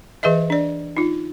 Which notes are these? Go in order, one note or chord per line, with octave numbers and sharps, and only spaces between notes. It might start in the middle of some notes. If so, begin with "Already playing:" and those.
E3 G#4 B4 D#5 E5
D4 D5
D#4 F4